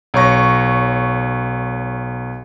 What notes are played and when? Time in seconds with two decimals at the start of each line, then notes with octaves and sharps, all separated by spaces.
0.14 B1 C#5 C#6 A#6